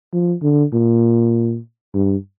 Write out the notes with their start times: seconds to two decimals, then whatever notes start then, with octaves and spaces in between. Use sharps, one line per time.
0.13 F3
0.43 D3
0.73 A#2
1.94 G2